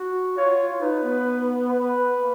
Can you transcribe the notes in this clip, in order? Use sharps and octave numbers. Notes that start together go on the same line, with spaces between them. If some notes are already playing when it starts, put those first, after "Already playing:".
Already playing: F#4
F4 C#5
F4
D#4 B4
B3
B4
A#3